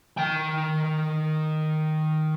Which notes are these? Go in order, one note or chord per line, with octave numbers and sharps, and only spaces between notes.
D#3 G5